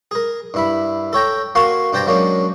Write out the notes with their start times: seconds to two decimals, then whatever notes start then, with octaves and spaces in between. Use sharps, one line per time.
0.11 G#4 A#4
0.54 G2 E4 B5
1.13 A4 C#5 G5 A#5
1.55 A#3 F#4 F5 G#5 C6 C#6
1.93 G2 D4 C5 G5 A5 A#5
2.07 F#3 G#3 A#3 C#4 D4